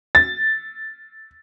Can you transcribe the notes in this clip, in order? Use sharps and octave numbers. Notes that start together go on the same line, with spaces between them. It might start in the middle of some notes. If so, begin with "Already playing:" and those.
A6